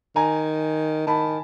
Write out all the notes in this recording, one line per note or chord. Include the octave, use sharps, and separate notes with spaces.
D#3 G#5 A#5
D#3 A5 B5